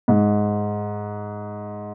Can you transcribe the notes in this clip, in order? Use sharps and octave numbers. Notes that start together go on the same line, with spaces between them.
G#2